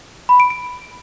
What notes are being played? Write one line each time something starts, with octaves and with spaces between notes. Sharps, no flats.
B5
D7
D7